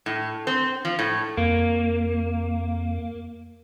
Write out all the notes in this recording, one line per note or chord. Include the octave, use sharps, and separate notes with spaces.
A2
C4
F3
A2
F2 A#3